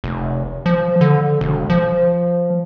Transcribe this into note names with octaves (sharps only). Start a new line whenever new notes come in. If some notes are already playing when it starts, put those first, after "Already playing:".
F1
F3
D3
E1
F3